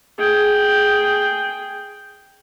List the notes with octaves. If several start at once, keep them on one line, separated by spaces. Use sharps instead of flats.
G#4 G5